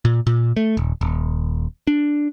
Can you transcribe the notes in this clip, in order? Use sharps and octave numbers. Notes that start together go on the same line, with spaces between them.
A#2
A#2
A3
D#1
D#1
D4